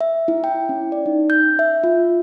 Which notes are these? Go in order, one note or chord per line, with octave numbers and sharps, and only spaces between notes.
E5
E4
G5
C#4
D5
D#4
G6
E5
F4